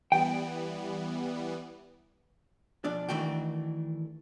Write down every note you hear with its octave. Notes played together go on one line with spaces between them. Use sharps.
E3 G3 B3 G5
B1 F3 D4 D5
D#3 E3 A3 D4 F#4 G5